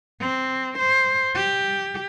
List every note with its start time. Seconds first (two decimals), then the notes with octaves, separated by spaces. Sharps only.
0.21 C4
0.78 C5
1.35 G4